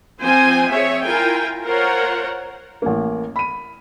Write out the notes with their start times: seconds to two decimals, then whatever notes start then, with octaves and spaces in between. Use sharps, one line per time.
0.20 F3 C4 C5 G5 G#5
0.70 C4 G#4 C#5 E5
1.05 E4 F4 A#4 G5 G#5
1.63 F4 A#4 C5 C#5 F#5
2.82 A1 A#3
3.36 B5 D#7